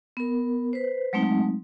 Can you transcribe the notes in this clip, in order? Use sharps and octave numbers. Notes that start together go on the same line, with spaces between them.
B3 A#4
B4 C5
F#3 G#3 A3 C4 D#4